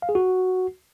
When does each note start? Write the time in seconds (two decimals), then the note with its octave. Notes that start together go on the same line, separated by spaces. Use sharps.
0.02 F5
0.09 G#4
0.15 F#4